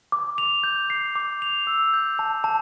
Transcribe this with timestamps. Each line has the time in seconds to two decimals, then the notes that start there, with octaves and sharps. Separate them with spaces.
0.12 D6
0.38 F7
0.64 G6
0.90 C7
1.15 D6
1.42 F7
1.67 E6
1.94 G6
2.19 A5
2.44 A5